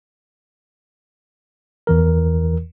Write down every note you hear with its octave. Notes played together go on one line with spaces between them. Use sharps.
E2 E3 A#4